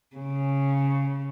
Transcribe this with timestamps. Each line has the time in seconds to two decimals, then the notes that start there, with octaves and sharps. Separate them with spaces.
0.16 C#3